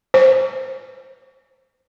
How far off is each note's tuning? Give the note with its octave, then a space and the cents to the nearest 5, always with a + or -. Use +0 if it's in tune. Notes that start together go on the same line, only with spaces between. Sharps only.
C5 +10